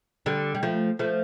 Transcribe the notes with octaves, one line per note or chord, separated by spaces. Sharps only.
D3 G3
G3
F3 A3
F3 A3